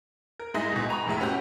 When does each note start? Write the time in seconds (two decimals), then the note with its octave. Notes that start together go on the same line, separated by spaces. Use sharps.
0.40 A#4
0.54 G#2 G#3 D#4 E4 G#4 A#6
0.72 C#2 B2
0.89 G#5 A#5 B5 C#6
1.06 F1 F2 A2 G#3 E5
1.20 B3 C#4 F#4 G4